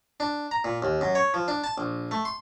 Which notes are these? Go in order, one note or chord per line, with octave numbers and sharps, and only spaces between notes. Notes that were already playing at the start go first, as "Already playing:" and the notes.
D4
A#5
A#2
D#2
F#2
C#5
F3
D4
A5
A#1
A3
C6